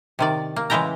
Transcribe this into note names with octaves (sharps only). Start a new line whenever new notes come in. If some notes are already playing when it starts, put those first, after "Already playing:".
C3 D#3 D5
A#3
C#3 E3 G#3 E4 G5 A#5